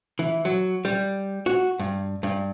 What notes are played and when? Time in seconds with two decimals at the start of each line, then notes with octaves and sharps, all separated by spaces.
0.19 E3
0.45 F#3
0.85 G3
1.46 F#4
1.79 G2
2.23 G2